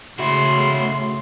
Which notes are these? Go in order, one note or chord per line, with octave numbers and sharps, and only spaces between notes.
C#3 A3 E4 F#4 C6